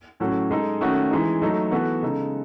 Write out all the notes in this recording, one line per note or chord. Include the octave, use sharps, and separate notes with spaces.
A2 F#3 C#4 F#4 A4
G#3 D#4 A4
D#3 A3 C#4 F#4
E3 G#3 D#4
F#3 A3 D#4 A4
E3 B3 F#4 A4
C#3 G#3 D#4 A4